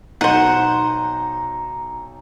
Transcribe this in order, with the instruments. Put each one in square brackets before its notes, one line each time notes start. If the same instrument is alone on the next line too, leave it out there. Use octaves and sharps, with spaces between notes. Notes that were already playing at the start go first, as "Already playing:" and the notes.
[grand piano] B1 D#4 D#7 [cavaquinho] C5 F#5 [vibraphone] A#5